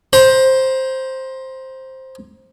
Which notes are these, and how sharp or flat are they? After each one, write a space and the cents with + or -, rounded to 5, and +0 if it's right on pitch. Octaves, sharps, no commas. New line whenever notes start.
C5 +5 A#5 +35